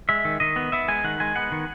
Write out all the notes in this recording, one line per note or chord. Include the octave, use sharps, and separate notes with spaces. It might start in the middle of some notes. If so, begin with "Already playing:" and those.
G#3 E5
D#3
D#3 D#5
B3
B3 E5
G#3 G#5
D#3 F#5
G#3 G#5
B3 F#5
D#3